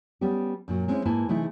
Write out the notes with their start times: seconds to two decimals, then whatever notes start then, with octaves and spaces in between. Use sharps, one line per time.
0.21 G3 B3 C#4 G4
0.68 F#2 A#2 F#3
0.88 G#3 C4 C#4 E4
1.05 G#2 A#3 E4 B4 G#5 A5
1.28 C3 E3 A3 D#4 E4 G#4